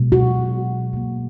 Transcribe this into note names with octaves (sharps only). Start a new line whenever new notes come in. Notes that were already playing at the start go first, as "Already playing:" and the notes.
Already playing: B2 G#3 B3
F#4
B2 A#3